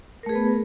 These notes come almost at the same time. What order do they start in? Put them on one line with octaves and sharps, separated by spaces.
A#4 A3 G#4 B4 B3